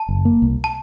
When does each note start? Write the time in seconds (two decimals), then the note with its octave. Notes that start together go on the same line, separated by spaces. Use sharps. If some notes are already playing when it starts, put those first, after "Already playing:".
Already playing: A5
0.09 F#1
0.25 A#3
0.42 C2
0.64 A5